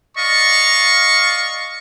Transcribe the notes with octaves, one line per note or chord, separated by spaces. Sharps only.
D5 D#5 F5 C#6